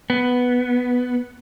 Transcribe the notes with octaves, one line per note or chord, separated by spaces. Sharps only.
B3